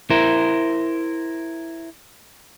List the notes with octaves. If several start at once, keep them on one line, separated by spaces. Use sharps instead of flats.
E4 A#4 C5